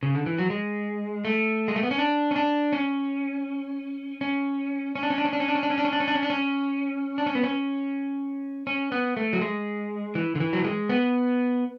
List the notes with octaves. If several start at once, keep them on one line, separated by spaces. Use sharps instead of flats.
C#3
D3
E3
F#3
G#3
A3
G#3
A3
B3
C#4
D4
C#4
D4
C#4
C#4
C#4
D4
C#4
D4
C#4
D4
C#4
D4
C#4
D4
C#4
D4
C#4
D4
C#4
D4
C#4
D4
C#4
D4
C#4
B3
C#4
C#4
B3
A3
F#3
G#3
E3
D3
E3
F#3
G#3
B3